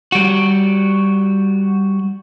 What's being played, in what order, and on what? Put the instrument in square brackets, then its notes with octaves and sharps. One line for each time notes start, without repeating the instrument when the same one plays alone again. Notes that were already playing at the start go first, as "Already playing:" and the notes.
[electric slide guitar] G3 F#4